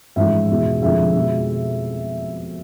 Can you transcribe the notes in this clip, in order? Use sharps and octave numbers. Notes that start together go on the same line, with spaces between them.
A1 G#2 F3 G#3 E5
E2 B2 G#3
F1 F2 D3 G#3 E5
B2 G#3